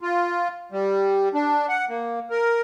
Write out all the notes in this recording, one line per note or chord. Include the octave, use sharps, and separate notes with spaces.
F4
G3
D4
F#5
A#3
A#4